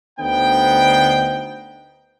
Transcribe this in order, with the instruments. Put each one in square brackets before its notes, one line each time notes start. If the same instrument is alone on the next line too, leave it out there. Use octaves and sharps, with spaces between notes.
[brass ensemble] D2 D3 B3 D#4 C5 G5